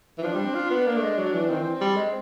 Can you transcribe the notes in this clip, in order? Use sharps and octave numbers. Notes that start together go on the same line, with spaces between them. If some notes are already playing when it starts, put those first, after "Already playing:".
E3
F3 D4
G3
C4
F4
B3
A#3 D4
A3
G#3
F#3
E3
D#3 C4
E3
G3
G#3